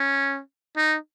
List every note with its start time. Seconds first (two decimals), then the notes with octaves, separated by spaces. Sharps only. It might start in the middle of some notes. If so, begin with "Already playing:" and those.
Already playing: C#4
0.77 D#4